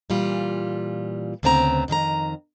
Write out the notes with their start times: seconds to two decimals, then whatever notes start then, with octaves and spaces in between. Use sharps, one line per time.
0.10 A#2 E3 G3 F4
1.43 D2 C#3 B3 C4 A5 A#5
1.88 F2 D#3 G#4 A#5